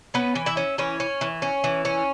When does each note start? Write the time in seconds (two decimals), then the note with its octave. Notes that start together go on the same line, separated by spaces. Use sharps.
0.14 B3 C#4 B4
0.35 E3
0.46 E4 E5
0.57 C#4
0.78 E3 C#4 C#5
1.00 C#4
1.21 E3
1.42 C#4
1.64 E3
1.85 C#4